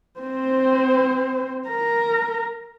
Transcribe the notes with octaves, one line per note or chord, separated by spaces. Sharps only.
C4 C5
A#4 A#5